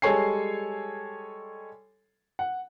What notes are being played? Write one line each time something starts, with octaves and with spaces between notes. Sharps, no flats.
G3 G#3 A4 C#5 G#5 C7
F#5